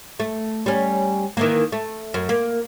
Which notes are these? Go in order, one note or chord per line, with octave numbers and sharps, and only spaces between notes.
A3
G3 C#4
D#3 E3 A#3
A3
F#2
A#3